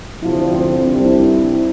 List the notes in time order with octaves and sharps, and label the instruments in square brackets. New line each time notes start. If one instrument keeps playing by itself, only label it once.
[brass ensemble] D2 C3 F3 [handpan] E4
[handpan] D4
C4
C4
[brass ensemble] C2 C3 G3 [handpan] D4
[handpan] E4
E4
E4